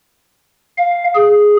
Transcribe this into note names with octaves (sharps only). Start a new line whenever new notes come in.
F5
G#4